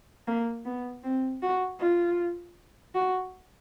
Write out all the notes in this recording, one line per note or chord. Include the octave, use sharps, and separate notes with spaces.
A#3
B3
C4
F#4
F4
F#4